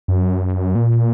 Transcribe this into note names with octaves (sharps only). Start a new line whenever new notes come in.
F#2
A#2